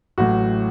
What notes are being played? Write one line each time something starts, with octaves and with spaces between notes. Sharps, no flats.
A1 A2 F#3 F#4